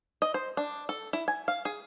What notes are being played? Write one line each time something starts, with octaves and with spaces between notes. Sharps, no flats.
D#5
C5
D4
A4
E4
G#5
F5
G#4